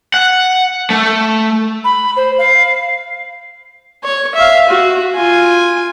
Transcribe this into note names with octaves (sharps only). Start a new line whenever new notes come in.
F#5
A3
B5
C5
F5
C#5
E5 F5
F#4
F4 G#5